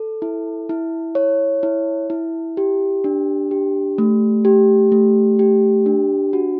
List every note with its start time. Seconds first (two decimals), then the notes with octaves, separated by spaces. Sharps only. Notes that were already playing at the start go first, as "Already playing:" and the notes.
Already playing: A4
0.22 E4
0.69 E4
1.15 C#5
1.63 E4
2.10 E4
2.57 G4
3.04 D4
3.51 G4
3.98 A3
4.45 G4
4.92 A3
5.39 G4
5.86 D4
6.33 F#4